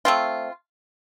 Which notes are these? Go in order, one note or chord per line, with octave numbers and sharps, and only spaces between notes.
A3 C4 F4